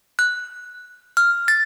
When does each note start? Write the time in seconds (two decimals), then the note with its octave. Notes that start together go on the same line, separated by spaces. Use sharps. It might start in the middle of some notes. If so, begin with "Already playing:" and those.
0.19 F#6
1.17 F6
1.48 A6